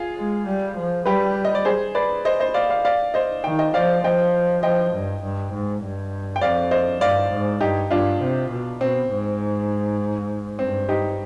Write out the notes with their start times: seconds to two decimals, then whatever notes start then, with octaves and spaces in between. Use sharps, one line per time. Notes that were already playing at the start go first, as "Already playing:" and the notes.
Already playing: F4 G#4
0.17 G#3
0.46 G3
0.77 F3
1.06 G3 G4 B4
1.45 D#5
1.55 D5
1.65 G#4 C5
1.95 B4 D5
2.25 C5 D#5
2.40 C5 D#5
2.54 D5 F5
2.70 D5 F5
2.85 D5 F5
3.14 C5 D#5
3.44 D#3 G5
3.59 D#5 G5
3.74 F3 D5 F5
4.04 F3 D#5 G5
4.63 F3 D#5 G5
4.93 G2
5.23 G2
5.53 G#2
5.82 G2
6.36 G5
6.41 F2 D5 F5
6.71 C5 D#5
7.01 G2 D5 F5
7.31 G#2
7.61 G2 D#4 G4
7.91 G2 D4 F4
8.21 C3
8.50 B2
8.81 B2 C4
9.10 G#2
10.59 G2 C4
10.89 D#4 G4